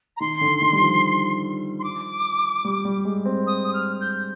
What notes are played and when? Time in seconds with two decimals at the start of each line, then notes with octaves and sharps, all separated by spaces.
0.16 A#5
0.20 D#3 C6
0.41 D3
0.62 D#3
0.72 G3
0.82 F3
1.79 C6
1.84 D6
2.65 G3
2.85 G3
3.05 G#3
3.25 C4
3.46 D#6
3.68 D#6
3.73 F6
4.00 G6